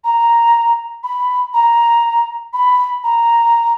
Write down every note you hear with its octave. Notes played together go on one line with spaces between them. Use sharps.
A#5
B5
A#5
B5
A#5